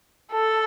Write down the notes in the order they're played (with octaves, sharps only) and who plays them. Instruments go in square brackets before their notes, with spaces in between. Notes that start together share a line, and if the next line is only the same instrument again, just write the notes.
[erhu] A4